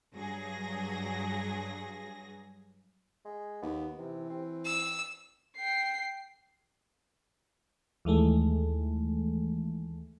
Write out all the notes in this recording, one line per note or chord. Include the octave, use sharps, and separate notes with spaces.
G2 F#3 G#4 A#6
G#3
D#2 B3
C3 E3
C4
E6
G5 C7
D#2 E3 G#3 A3